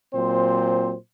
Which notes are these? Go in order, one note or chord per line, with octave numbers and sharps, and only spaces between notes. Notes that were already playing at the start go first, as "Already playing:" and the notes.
A#2 F#3 C4 C5